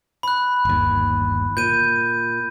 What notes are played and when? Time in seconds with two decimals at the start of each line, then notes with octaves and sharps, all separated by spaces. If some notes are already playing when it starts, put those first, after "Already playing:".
0.23 B5 F#6
0.65 G1 D#2
1.57 A#2 G6 D#7